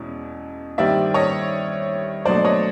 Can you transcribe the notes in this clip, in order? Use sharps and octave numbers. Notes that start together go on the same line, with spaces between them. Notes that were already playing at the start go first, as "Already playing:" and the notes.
Already playing: E2 B2 G#3 C#4 E4
G2 D#3 G3 C4 D5 E5
C#5 D#5
B2 F#3 A3 D4 C5 D5
C#5 D#5